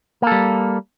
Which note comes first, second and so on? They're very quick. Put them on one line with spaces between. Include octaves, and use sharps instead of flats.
A#3 A4 G3